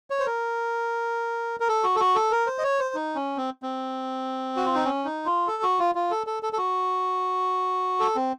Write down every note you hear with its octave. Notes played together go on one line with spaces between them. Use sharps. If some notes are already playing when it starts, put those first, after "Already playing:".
C#5
C5
A#4
A#4
A4
F#4
A4
F#4
A4
A#4
C5
D#5
C#5
C5
D#4
C#4
C4
C4
F#4
F4
D#4
C#4
D#4
F4
A4
F#4
F4
F4
A4
A4
A4
A4
F#4
A4
C4